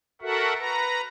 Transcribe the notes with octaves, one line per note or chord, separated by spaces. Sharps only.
F#4 A4 A#4 E5 F#5
B4 A#5